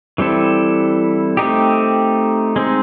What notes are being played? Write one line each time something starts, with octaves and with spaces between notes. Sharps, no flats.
E3 G3 C4 E4 A4
A3 C4 D#4 G4
G#3 C4 D#4